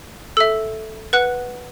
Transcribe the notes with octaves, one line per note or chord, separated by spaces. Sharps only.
A4 E5 E6
B4 F#5 F#6